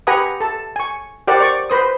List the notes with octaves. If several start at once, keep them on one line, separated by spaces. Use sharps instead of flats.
G4 B4 F#5 G#5 A#5 D#6
A4 A5
G#5 C#6
G4 A#4 C5 D5 F#5
D5 C#6
B4 C5 D#6